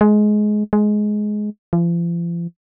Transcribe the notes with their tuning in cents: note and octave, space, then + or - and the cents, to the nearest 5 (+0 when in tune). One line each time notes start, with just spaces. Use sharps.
G#3 +20
G#3 +15
F3 -40